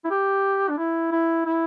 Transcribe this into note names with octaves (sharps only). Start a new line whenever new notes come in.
E4
G4
D4
E4
E4
E4